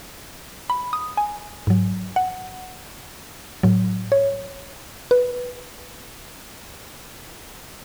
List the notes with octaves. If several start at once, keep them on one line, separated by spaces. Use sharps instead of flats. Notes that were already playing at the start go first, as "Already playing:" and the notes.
B5
D#6
G#5
G#2 F#3
F#5
A2 F#3
C#5
B4